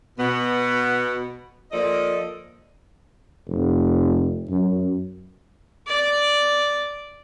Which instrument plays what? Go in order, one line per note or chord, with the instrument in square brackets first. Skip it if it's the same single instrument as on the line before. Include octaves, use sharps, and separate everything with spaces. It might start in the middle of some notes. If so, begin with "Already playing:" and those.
[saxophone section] B2 B3
F3 A#3 F4 A4 D5 D#5
[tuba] F1
F#2
[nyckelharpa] D5